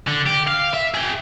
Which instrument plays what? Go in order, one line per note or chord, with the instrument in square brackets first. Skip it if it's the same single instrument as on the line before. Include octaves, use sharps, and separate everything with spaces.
[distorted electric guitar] D3
G4
F5
E5
G#4 G5